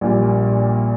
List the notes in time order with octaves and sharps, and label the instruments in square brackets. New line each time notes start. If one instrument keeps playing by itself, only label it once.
[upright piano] A#1 A#2 G3